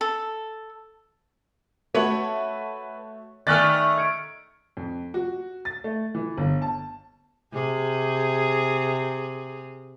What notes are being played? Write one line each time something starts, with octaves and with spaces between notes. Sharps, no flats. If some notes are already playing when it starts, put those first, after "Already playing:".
A4
A3 F#4 B4 C#5 F#7
D#3 A3 D5 G#5 F6 F#6 A6
G#6 C#7 D7
F2
F#4
A6
A3
E3
G1
A5
C3 G#4